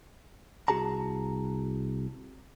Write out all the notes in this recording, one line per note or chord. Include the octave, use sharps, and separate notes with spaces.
C2 F#4 G#4 A5 A#5